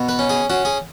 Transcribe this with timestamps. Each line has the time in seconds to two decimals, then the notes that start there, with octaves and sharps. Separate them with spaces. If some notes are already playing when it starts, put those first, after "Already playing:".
Already playing: B2
0.09 B4
0.19 C#4
0.29 G#4
0.50 C#4 F#4
0.65 G#4